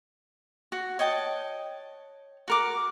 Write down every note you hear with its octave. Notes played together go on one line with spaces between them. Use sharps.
F#4
C#5 D#5 G5 A5
F#4 A#4 D6